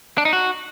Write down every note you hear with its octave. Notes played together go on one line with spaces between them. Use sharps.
D4
D#4
F#4